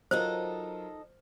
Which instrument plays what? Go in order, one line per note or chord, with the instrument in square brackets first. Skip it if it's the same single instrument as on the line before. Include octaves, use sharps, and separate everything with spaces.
[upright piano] F#3 F4 A#4 [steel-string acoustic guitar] D#4 A4 D#5 [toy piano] C5